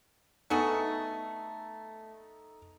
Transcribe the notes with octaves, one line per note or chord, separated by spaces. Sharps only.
A3 B3 D#4 F#4 G#4 A4